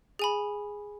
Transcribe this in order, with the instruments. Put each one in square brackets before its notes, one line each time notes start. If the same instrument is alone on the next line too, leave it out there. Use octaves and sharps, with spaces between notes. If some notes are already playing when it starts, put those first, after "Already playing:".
[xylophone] G#4 G#5 B5